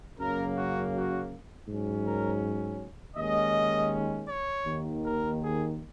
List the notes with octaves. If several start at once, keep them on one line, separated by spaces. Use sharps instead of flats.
F#2 C#3 F#3 A#3 A#4
F#4
F#4
G#2 F#3 C#4
A#4
D#2 D#3 G#3 C#4 D#5
C#5
D#2 D#3 A#3
A#4
G#4